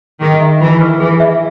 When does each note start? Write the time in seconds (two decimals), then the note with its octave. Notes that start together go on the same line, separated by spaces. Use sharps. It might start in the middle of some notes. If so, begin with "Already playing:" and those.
0.21 D#3 G#4
0.41 E5
0.60 E3 F4
0.81 B4
1.00 E3 G#4
1.20 E5